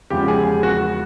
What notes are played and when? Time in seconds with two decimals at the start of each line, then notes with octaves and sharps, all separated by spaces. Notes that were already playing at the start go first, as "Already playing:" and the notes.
0.10 E2 C#3 F3 G#3 G4
0.28 G#4
0.63 F#4